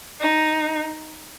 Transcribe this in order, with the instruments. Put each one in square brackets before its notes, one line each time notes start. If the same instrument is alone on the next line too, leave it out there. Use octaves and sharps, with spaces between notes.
[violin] D#4